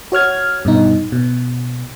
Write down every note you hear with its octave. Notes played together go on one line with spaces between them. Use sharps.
F#4 C#5 F6 G#6
G2 B2 D#4
B2